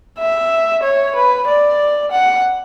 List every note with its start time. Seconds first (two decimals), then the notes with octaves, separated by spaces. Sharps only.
0.19 E5
0.83 C#5
1.15 B4
1.47 D5
2.12 F#5